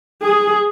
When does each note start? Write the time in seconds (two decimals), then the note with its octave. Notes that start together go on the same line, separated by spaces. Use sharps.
0.22 G#4